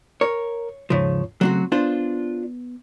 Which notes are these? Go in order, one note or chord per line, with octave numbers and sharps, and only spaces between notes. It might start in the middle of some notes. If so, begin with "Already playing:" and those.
A#4 C#5
D#2 G#2 C#3 F3 C#5
C#3 F#3 A3 C4 F#4
B3 D4 F4 C5